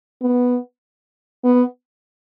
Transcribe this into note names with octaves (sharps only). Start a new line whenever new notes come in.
B3
B3